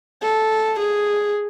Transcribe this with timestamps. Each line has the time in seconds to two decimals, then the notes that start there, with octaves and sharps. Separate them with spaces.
0.23 A4
0.80 G#4